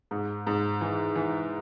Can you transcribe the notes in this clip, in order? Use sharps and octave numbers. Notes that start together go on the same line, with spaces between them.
G#2
G#2
E3
E3